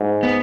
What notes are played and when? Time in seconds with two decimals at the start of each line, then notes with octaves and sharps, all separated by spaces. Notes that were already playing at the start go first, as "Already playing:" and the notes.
Already playing: G#2
0.23 B3